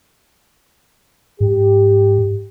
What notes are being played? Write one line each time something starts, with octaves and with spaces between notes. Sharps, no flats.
G#2 G4